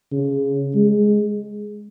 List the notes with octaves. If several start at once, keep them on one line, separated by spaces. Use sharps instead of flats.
C#3
G#3